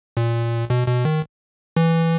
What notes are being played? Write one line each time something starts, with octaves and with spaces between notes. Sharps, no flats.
A#2
B2
B2
D#3
E3